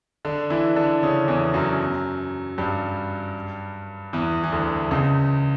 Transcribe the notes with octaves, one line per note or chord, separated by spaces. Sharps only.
D3 D4
E3 E4
D3 D4
C#3 C#4
E2 E3
F#2 F#3
G2 G3
E2 E3
E3
D2 D3
C#2 C#3